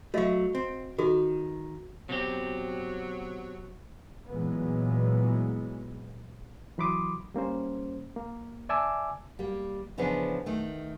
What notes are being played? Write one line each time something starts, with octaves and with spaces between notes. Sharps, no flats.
F#3 A3 F#4 D#5 F5
C4
D#3 F#4 A4
B2 F#3 C4 G4
A#2 E3 F#3 G#3 B3
E3 F#3 B5 C6 D6 D#6
G3 A#3 C#4 C5
A#3
D5 E5 G#5 A5 D6 E6
G3 A#3
C#3 E3 F3 B3 C#4 D4
D#3 A3